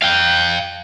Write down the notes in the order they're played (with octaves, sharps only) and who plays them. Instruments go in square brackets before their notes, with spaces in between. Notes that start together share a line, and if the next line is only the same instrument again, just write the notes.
[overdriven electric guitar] F5 G5